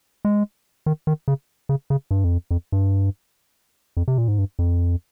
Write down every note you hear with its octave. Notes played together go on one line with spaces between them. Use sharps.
G#3
D#3
D#3
C#3
C#3
C#3
G2
F2
F2
G2
F2
C3
A#2
G#2
G2
F2